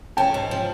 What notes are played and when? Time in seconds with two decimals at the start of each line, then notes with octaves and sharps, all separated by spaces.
0.17 C#4 G5 A5
0.34 G#2
0.51 F3